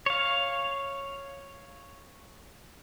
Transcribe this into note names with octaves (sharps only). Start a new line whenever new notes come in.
C#5 F5